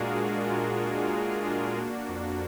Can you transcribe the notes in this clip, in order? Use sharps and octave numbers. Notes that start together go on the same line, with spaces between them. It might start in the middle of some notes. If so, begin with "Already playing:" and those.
Already playing: A#2 G#3 D4 F4 F#4 G#4 A#4
A#2
D4
A#2
A#2 F#4
D4
A#3
F2